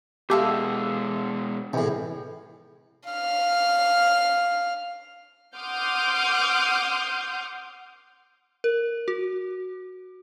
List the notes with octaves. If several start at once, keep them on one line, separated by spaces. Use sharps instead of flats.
B2 G#3 E4 G4 A4 F5
E2 A2 C3 E3
F5 F6
F#5 C6 D6 D#6 F6 G6
A#4
F#4